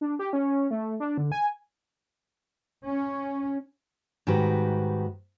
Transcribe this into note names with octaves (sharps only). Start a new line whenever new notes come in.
D4
G4
C#4
A3
D4
D3
G#5
C#4
G#2 D#3 G3 D#4 F#4 B4